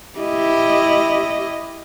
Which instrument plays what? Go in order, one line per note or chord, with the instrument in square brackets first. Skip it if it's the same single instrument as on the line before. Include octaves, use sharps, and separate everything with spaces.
[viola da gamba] E4 G4 D#5